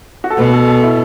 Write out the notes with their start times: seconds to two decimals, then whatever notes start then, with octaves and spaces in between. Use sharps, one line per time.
0.24 F#4
0.30 A4
0.38 B2 B4
0.53 A4
0.68 A4
0.83 E4